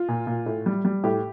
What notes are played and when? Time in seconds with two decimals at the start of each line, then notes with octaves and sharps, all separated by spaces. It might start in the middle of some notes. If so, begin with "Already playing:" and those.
Already playing: F4
0.08 A#2
0.27 A#2
0.46 A2
0.66 G3
0.85 G3
1.04 A2 G4